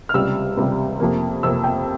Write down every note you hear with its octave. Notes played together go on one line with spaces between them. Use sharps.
F6
C#2 C3 G3 E6
C#2 C3 G3
F2 C3 F3 A#3
F2 C3 F3 A#3 E6
G5